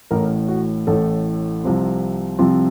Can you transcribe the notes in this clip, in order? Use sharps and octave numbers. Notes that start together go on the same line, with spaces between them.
A1 A2 A3 A#4
F#4
A1 A2 A3 A4
C2 C3 F3 C4
C2 C3 F3 C4